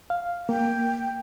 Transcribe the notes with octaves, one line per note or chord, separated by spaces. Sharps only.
F5
A#3 G5